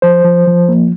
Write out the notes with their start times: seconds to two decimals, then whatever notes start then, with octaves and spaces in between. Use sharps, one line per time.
0.02 F3 C5
0.24 F3
0.47 F3
0.69 A#3